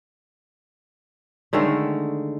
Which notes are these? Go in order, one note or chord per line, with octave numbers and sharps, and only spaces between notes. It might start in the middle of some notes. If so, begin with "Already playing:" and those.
D3 D#3 G#3 A3